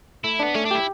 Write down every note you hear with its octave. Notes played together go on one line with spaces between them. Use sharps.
A3 E4
B3 D4
A3 C#4
D4
E4 G4